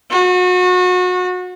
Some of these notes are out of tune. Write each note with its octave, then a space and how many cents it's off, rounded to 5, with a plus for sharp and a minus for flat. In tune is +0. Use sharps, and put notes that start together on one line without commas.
F#4 -30